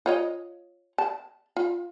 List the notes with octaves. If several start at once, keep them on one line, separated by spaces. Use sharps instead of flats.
F4 C#5 D#5
A5
F4